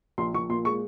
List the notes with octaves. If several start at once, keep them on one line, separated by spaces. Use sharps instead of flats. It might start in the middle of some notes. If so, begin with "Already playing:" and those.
A#1 C6
A#1 C#6
A#2 C6
G#3 C#6